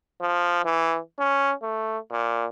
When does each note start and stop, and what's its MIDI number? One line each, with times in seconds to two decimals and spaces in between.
0.22 0.64 53
0.65 0.98 52
1.19 1.53 61
1.62 1.98 57
2.11 2.46 46